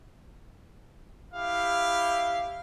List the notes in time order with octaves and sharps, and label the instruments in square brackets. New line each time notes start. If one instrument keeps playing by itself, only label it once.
[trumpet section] E4 G4 F5